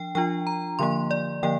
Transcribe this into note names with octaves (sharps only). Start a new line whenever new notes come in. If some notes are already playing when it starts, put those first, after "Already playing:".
Already playing: F3 D4 G5
F3 D4 F4 G5
A#5
D3 F3 A#3 C6
D5
D3 F3 A#3 G5